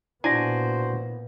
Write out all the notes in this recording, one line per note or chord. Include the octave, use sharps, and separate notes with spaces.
A#2 B3 D4 E4 F#4 C5 G#5 A#6